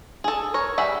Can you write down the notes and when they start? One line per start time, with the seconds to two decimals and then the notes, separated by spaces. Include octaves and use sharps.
0.24 G#4 A4
0.54 A#4 C#5
0.78 G3 G#4 E5 F#5